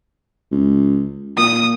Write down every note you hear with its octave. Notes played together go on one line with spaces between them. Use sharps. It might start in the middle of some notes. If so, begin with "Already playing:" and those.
C#2
A#2 D#6